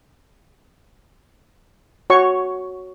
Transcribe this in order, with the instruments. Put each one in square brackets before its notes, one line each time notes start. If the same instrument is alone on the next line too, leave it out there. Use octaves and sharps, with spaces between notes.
[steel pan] F#4 C#5 C#6